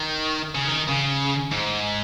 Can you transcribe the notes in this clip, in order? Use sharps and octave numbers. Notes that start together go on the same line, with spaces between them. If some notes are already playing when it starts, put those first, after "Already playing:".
Already playing: D#3
C#3
D#3
C#3
G#2